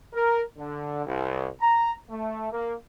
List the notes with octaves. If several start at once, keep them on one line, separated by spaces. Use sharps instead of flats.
A#4
D3
C2
A#5
A3
A#3